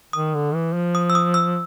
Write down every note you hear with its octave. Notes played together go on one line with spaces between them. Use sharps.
D#3 D#6
D3
E3
F3
D#6
E6
D#6
E6